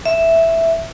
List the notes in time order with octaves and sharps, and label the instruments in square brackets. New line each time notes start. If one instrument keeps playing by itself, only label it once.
[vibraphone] E5